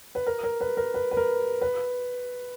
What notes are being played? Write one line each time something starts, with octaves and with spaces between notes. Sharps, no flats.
B4
A#4
A#4
B4
A#4
B4
B4
A#4
B4